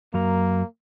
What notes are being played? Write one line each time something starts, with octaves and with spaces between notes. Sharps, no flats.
F#2 F#3 A#3 A#5